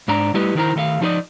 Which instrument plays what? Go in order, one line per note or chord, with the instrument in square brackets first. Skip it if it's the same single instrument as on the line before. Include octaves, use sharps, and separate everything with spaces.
[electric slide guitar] G#2 D4 A#5
G3 A3 E4 G4 B4 D#5
D#3 D#4 E4 A#4 C5 A#5
D#3 A3 D#5 F5
F3 F#3 D#4 B4 D5 D#5